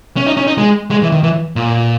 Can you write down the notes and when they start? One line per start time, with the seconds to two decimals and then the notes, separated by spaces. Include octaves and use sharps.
0.17 C#4
0.26 D#4
0.37 C#4
0.47 D#4
0.58 G#3
0.91 G#3
1.02 E3
1.12 D#3
1.23 E3
1.56 A#2